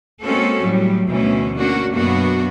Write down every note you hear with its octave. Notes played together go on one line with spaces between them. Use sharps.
G#3 A#3 C4 C#4 F#4 A4
A2 F#3 G3
D2 B2 E3 C#4
A#3 C#4 D4 F#4
F#2 B2 A#3 B3 D4 F#4